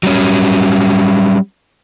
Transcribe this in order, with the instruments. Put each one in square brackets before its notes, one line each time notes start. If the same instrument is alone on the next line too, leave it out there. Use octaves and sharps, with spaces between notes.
[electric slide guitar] F#3 G3 C#4